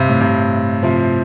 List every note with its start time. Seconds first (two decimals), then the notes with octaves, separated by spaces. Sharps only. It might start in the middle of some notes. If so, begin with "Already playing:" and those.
Already playing: G2 C3
0.09 A2
0.20 G2 C3
0.83 C3 F3